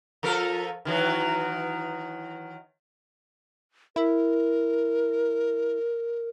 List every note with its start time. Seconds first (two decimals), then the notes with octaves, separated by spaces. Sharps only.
0.23 F3 A4 A#4
0.85 D#3 E3 F#3
3.96 E4 A#4